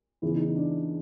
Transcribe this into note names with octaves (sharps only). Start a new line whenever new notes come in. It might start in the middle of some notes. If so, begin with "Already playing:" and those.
E2 C#3 E3 E4
D#4
D#4
D4